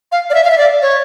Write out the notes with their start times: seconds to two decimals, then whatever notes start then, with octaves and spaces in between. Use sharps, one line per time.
0.12 F5
0.30 D5
0.35 E5
0.44 F5
0.51 E5
0.58 D5
0.82 C#5